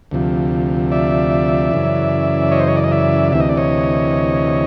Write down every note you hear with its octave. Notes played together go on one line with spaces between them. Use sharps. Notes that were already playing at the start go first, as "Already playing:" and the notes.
D2 C3 F3
D5 E5
F#2 C#3 E3
C#5 D#5
C5
C#5
D5
D#5
D5 E5
D2 C3 E3 E5
D#5
D5
C#5 D#5